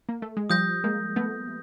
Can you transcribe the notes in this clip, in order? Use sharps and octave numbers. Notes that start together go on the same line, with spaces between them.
A#3
A3
G#3
F3 G3 D#6 G6 A#6
G#3 A#3
A3 B3